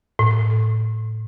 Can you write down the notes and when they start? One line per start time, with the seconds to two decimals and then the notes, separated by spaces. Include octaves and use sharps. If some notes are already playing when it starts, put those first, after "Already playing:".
0.19 A2